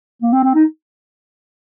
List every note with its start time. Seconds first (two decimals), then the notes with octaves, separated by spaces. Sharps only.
0.22 A#3
0.32 C4
0.44 C4
0.54 D#4